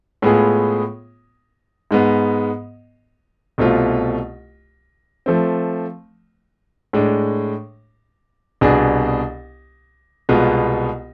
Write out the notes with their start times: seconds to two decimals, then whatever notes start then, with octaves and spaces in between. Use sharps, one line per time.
0.22 A2 G#3 B3 F4 G#4
1.91 G#2 G#3 B3
3.58 C2 B2 A3 C4 F4
5.26 F3 A3 C4
6.93 A2 G#3 D4
8.61 C2 B2 B3 D4 G#4
10.29 C2 B2 G#3 B3 F4